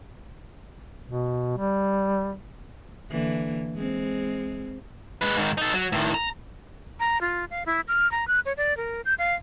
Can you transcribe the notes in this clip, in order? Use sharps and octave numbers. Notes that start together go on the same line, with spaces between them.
B2
G3
D3 E3 A#3
G#3 C4
G#3 B4
G#2 D#3
D#4 A4
F#3
A2 D#3
A#5
A#5
F4
F5
E4
F6
A#5
F#6
C#5
D5
A#4
G6
F5